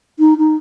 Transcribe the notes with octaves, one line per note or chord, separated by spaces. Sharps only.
D#4
D#4